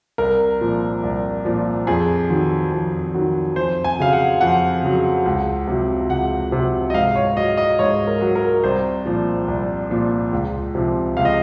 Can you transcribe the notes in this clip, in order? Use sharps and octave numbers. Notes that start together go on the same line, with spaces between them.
C2 A#4
A#2 F3
C2
A#2 F3
F2 G#4
D#3 F#3
F2
D#3 F#3
F2 C5
G#5
C#3 F#3 F5
F#5
F2 F#5
C#3 F#3
C#2
C3 F#3
C#2 F#5
C3 F#3
D#5
G#2 F5
C#5
F#3 D#5
D#5
G#2 C#5
A#4
F#3
A#4
C2 C5
A#2 F3
C2
A#2 F3
C#2
C3 F3
C#2 F5
D#5